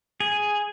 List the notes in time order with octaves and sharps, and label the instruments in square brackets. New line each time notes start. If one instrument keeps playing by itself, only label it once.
[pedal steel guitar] G#4